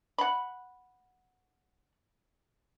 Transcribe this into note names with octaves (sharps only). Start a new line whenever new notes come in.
F#5 B5